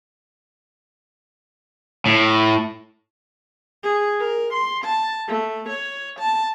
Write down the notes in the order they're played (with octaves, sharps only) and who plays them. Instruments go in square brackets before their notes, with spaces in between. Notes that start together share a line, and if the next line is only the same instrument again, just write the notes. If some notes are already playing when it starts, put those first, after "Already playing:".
[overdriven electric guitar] A2
[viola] G#4
A#4
C6
A5
A3
C#5
A5